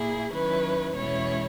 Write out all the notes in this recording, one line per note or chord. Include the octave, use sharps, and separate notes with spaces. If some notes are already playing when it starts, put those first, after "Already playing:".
Already playing: A#2 A#3 E4 G#4
D#3 F#3 C#4 E4 B4
E2 B2 G#3 C#4 E4 C#5